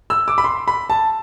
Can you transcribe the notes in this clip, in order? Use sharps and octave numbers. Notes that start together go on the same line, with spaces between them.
E6
D6
B5
C6
B5
A5